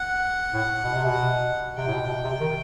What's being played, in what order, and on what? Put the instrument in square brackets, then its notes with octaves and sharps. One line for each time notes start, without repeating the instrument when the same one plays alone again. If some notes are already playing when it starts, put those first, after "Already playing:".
Already playing: [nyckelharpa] F#5
[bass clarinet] A2
B2
C3
B2
[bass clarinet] C3 [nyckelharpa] G5
[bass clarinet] A2
B2
B2
C3
D#3